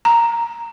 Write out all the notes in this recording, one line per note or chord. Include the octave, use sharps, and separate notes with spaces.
A#5